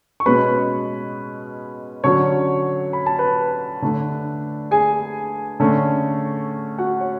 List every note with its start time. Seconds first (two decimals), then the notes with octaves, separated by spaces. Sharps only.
0.20 C#6
0.26 B2 G#3 C#4 B4 B5
2.04 D3 F#3 C#4 C#5 C#6
2.93 B5
3.06 A5
3.19 B4 B5
3.82 D3 A3 D4
4.71 G#4 G#5
5.60 D3 A3 C#4
6.78 F#4 F#5
7.01 C#5